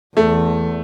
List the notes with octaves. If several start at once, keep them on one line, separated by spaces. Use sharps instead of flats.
E2 A3